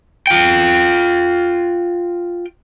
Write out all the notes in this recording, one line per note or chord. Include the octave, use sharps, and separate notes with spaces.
F4 G5